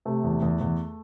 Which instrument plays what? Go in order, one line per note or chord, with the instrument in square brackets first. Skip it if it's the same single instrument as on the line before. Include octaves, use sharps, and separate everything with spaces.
[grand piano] C3 A3
E2
E2
E2